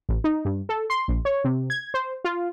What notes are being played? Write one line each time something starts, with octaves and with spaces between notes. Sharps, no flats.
A1
D#4
G2
A4
C6
A#1
C#5
C3
G#6
C5
F4